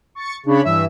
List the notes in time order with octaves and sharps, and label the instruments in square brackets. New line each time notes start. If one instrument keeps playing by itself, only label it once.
[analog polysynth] C#6 A6 C#7
[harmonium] C#3 [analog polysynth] D4 C#5 B5
[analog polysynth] G2 E3 [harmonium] E5